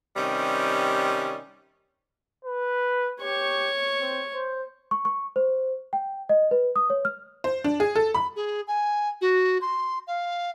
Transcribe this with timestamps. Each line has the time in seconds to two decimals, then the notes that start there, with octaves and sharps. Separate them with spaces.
0.17 C3 D#3 G3 C#4
2.45 B4
3.21 G4 C#5 C#6
4.01 C4
4.34 C5
4.91 C#6
5.05 C#6
5.36 C5
5.93 G5
6.29 D#5
6.51 B4
6.76 D#6
6.90 C#5
7.05 F6
7.44 C5
7.64 D4
7.80 G#4
7.95 A4
8.14 B5
8.36 G#4
8.67 G#5
9.21 F#4
9.61 C6
10.07 F5